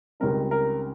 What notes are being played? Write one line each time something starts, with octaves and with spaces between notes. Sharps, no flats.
C#2 C#3 G3 C4 D#4 A#4
A#4